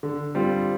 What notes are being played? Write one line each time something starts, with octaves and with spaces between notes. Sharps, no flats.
D3
G3 C4 F4